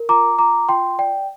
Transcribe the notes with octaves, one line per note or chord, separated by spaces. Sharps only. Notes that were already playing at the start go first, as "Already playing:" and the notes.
Already playing: A#4
F4 A#5 D6
F4 A#5 D6
F4 G5 C6
D5 G5